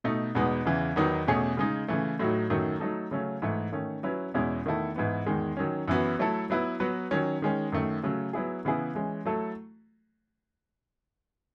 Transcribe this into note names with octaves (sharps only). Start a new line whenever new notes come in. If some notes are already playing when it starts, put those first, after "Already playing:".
B2 A3 D#4
E2 B2 G#3 B3 D#4
E2 C#3 E3
E2 D#3 F#3 B3 D#4
E2 B2 A3 C#4 G#4
C#3 G#3 D#4
C#3 E3 A3
A2 F#3 A3 D#4 F#4
F#2 D#3 F#3 A3
F#3 A3 D#4 A4
C#3 F#3 A3 C#4
G#2 E3 A3
D#3 A3 C#4
F#3 C#4 E4 B4
E2 B2 G#3 C#4 E4
E2 D#3 A3 E4 A4
G#2 E3 B3
E2 D#3 G#3
D#3 F#3 C#4
F#2 E3 B3 F#4
F#3 A3 E4 A4
F#3 B3 E4 B4
F#3 B3 F#4 B4
D#3 F#3 C#4
D#3 G#3 C#4
F#2 D#3 A3
C#3 F#3 A3
F#3 B3 E4 G#4
C#3 E3 B3 E4 G#4
E3 G#3 C#4
F#3 A3 E4 A4